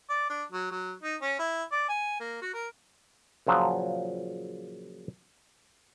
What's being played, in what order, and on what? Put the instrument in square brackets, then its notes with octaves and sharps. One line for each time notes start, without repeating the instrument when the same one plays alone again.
[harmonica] D5
D4
F#3
F#3
D#4
C#4
E4
D5
G#5
A#3
F#4
A#4
[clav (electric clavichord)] A#2 C#3 F3 F#3